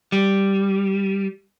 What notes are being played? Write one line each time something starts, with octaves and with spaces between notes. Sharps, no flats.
G3